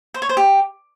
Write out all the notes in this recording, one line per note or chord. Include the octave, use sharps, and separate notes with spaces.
C5
C#5
C5
G4